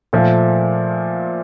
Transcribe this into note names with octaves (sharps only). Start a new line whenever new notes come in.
A#2 F3 A3